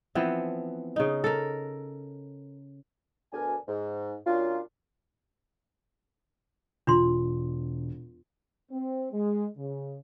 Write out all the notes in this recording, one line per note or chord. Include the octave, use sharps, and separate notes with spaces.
E3 F3 B3 C4
C#3 D#4
A4 A#4
D2 B2 D4 A#4 G#5
G#2
A#2 F#3 C#4 D4 F4
E1 D4 F4 C6
C4
G#3
C#3